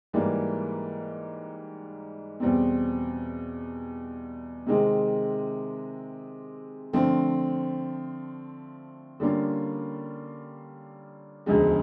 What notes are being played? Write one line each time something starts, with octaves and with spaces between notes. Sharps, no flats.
G#2 E3 G3 A#3
E2 B2 G3 C4
C3 D#3 G#3 C4
D3 F3 A3 C4
D3 G3 A#3 C#4 F4
E1 D2 C#3 F3 G#3